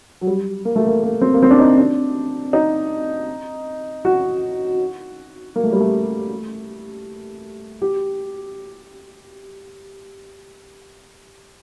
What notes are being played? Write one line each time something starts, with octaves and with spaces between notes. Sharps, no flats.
F#3
G3
A#3
A3
A#3
A#3
C4
A#3
C4
D4
D#4
D4
D#4
F#4
A#3
A3
G3
A3
G4